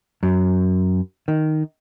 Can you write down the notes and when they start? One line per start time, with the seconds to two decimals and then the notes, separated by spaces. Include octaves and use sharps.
0.23 F#2
1.28 D#3